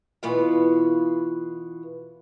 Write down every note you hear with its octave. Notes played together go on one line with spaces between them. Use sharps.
B2 E3 B3 F4 B4 F5